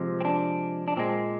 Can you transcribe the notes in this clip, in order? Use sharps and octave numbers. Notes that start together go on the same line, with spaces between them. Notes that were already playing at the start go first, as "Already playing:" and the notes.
Already playing: C3 F3 G#3
C4
D4
D4
A#2 G#3 C4